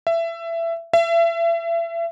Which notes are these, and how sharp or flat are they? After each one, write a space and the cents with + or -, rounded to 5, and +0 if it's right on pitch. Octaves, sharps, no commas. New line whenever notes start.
E5 +20
E5 +35